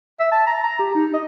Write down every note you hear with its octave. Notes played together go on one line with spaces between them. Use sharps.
E5
A5
A#5
A#5
G4
D#4
D#5